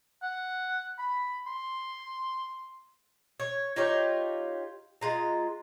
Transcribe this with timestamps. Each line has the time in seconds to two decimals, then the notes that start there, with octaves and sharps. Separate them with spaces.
0.22 F#5
0.98 B5
1.46 C6
3.40 C#5
3.76 D#4 F4 G4 C#5
5.01 G#3 F4 A#5